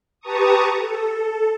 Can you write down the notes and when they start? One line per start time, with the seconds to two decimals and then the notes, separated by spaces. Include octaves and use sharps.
0.20 G4 B4 A5 A#5 C#6 D#6
0.73 A4